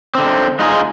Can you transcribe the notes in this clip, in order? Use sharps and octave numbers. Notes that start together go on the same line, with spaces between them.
D3 C4
G#3 D#4 F4 G4 G#4